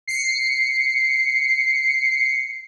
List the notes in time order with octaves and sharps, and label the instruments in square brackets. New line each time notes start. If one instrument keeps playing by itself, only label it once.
[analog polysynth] C7 C#7